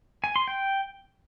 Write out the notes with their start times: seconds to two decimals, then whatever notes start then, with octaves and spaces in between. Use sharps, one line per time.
0.24 G#5
0.36 C6
0.48 G5